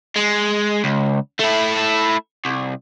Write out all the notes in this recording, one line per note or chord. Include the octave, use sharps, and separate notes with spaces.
G#3
C#2
A3 E4
C2